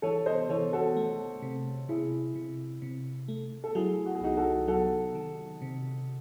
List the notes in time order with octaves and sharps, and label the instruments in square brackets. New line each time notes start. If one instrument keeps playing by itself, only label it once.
[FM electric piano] E3 [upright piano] A4 C#5
[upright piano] C5 D#5
[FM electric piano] E3 [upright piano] A4 C#5
[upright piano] F#4 A4
[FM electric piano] A3
C3
[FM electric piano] C3 [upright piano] E4 G#4
[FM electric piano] C3
C3
A3
[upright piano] A4
[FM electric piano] F#3 [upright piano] E4 G#4
[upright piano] F#4
G#4
[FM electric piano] C2 [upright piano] D#4 F#4
[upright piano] F#4 A4
[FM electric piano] F#3 [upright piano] F#4 A4
[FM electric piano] D#3
C3